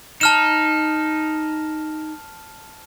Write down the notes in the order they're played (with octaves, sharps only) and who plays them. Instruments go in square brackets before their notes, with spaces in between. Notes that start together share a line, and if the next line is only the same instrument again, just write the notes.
[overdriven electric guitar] D#4 [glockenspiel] A5 F6 E7